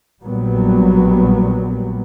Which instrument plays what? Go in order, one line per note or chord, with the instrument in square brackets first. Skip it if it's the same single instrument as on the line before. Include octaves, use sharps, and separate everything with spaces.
[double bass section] A#1 A#2 F#3 G3 B3